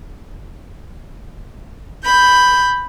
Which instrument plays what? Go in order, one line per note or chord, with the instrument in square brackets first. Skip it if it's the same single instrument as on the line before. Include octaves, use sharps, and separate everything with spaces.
[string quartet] B5 G6